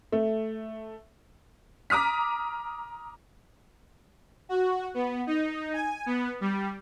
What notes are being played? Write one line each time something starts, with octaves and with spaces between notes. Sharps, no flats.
A3
A#5 D6 D#6 F6 B6
F#4
B3
D#4
G#5
B3
G3